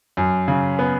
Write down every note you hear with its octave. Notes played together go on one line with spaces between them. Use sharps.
F#2
C#3
B3